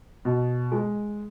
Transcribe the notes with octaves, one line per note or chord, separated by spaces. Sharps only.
B2
G#3